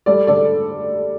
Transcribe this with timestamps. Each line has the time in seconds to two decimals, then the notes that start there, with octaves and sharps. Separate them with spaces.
0.06 G3 A4 D5
0.27 D3 A4 D5